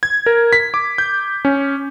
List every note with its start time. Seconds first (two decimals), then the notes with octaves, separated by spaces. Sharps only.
0.03 G#6
0.26 A#4
0.53 B6
0.74 D6
0.98 G6
1.45 C#4